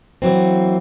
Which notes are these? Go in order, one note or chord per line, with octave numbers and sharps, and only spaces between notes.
E3 F#3 A#3 C4